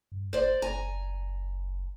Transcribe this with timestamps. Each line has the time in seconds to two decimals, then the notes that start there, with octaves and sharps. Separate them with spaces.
0.12 G2
0.33 G1 C5 D5
0.62 F#1 G#5 A#5